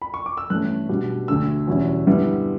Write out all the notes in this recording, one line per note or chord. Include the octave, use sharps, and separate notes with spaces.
B5
C#6
D6
E6
G2 E3 A3 C#4 F#6
B2 G3 D4
D2 D3 A3 D4 E6
E2 B2 G3 C#4 E4
G2 D3 G3 B3 E4